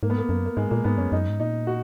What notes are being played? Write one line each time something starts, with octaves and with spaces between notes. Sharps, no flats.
G#2 A#3
B3
A#3
F#2 A#3
A#3
G#2 G#3
A#2 A#3
G#2 B3
F#2 C#4
F#2 D#4
G#2
A#2 D#4
F#4